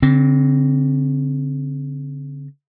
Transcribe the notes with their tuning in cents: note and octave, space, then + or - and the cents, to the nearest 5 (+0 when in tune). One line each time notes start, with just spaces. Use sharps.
D3 -45 C4 +0